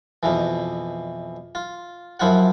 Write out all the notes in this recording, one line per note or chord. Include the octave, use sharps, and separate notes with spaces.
F2 B2 E3
F4
F#2 F3 E4 F4 F#5